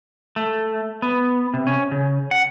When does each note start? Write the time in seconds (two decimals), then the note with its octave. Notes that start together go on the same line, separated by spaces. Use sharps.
0.36 A3
1.02 B3
1.54 C3
1.67 C#4
1.92 C#3
2.31 F#5